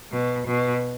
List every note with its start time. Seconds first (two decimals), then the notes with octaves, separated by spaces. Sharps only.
0.12 B2
0.47 B2